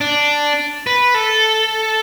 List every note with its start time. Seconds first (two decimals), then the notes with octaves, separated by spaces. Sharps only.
0.01 D4
0.87 B4
1.14 A4